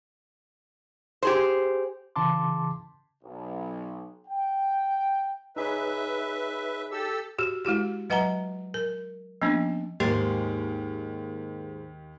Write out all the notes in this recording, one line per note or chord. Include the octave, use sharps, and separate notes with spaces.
G4 G#4 C5
C#3 E3 A5 C6 D6
B1
G5
D#4 G#4 B4 C#5 E5
G4 A4 E6
F#4 G4
G#3 E4 F#4 G4
F#3 B4 D#5 F#5 G#5 A#5
A#4
F3 A#3 B3 C#4 D4
D#2 G#2 A#3 G4